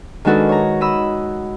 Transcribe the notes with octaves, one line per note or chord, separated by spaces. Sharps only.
D#3 G#3 D4 F#4 A4 B4
C#5 A#5
D#5 B5 E6